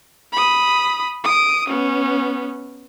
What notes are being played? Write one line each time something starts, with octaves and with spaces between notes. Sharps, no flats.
B5 D#6
D#6 D7
B3 C#4